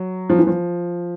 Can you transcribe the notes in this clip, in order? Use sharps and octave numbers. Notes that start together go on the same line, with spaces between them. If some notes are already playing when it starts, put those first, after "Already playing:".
Already playing: F#3
F3
E3
F3